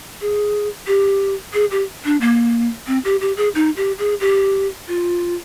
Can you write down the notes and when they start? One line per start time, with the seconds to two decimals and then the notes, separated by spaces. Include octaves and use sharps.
0.21 G#4
0.87 G4
1.54 G#4
1.71 G4
2.05 D4
2.21 A#3
2.87 C4
3.05 G4
3.21 G4
3.37 G#4
3.55 D#4
3.77 G4
3.99 G#4
4.20 G4
4.88 F4